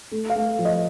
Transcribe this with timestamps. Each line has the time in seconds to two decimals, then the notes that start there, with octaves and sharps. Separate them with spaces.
0.12 A3
0.30 F5
0.36 A3
0.59 F3
0.65 D#5